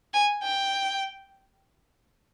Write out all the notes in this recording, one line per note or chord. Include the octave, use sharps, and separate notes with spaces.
G#5
G5